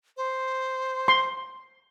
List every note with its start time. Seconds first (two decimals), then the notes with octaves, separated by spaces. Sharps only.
0.17 C5
1.08 C6